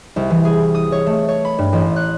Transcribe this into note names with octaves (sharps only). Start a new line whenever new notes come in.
C2
E3
G#4
D#6
C#5
A3
C#5
B5
G2
A1
F#6